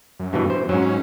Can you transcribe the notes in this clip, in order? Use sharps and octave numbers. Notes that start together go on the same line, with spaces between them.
F#2
G2 B2 E3
F#2 C5
G#2 F#3 C#4